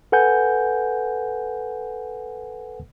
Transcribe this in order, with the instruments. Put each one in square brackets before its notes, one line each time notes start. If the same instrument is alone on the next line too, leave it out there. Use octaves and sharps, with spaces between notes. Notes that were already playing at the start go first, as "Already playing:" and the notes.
[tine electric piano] A4 B4 F#5 G#5 G6